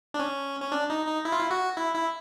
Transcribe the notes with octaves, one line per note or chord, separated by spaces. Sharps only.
D4
C#4
C#4
D4
D#4
D#4
E4
F4
E4
F#4
E4
E4